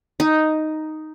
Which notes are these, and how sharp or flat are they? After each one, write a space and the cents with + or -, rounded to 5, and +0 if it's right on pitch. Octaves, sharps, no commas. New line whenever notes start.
D#4 +0